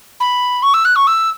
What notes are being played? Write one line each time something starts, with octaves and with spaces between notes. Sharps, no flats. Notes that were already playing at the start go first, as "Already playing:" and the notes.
B5
C#6
E6
F#6
C#6
E6